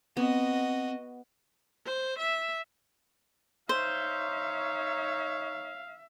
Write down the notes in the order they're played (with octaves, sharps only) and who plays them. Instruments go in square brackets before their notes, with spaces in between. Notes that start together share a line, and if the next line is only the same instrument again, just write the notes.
[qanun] B3 [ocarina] C4 [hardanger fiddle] F#4 D#5
[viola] C5
E5
[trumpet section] D#4 C#5 [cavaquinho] C5 [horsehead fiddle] E5 [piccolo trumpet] F5